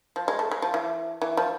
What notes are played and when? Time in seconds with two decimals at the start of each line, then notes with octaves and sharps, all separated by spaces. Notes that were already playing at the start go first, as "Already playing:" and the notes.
0.16 F3
0.28 G#3
0.39 A3
0.51 G#3
0.62 F3
0.74 E3
1.22 E3
1.37 F3